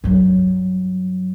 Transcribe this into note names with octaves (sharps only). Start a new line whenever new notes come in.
G2 F#3